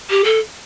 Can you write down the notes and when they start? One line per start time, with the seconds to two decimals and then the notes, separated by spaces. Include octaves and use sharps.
0.09 G4
0.24 A4